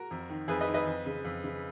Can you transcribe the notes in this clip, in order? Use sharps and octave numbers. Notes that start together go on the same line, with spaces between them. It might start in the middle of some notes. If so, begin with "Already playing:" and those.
Already playing: F#4 A#4
F2
D#3
F2 G#4 B4
B4 D#5
D#3
B4 D#5
F2
C#3
F2
C#3